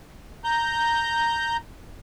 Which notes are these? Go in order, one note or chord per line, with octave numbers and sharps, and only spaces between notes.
A#5 G6